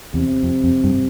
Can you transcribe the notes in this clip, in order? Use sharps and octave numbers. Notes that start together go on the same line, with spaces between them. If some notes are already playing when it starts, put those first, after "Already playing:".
E2 C3
F2
F2
G2